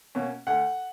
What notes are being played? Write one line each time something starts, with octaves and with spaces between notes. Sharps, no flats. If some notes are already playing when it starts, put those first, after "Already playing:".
B2 A#3 C#4
D2 F#5